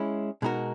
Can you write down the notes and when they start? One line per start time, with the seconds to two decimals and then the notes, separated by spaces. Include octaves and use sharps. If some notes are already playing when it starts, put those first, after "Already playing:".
Already playing: G#3 C#4 E4
0.42 B2 G#3 D#4 F#4 A#4